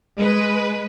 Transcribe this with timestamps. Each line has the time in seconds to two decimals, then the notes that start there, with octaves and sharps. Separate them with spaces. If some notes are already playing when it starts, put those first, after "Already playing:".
0.17 G#3 B4